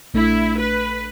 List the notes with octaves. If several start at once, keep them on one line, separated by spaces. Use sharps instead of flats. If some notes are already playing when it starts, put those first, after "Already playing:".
A#1 A3 D4 E4
B4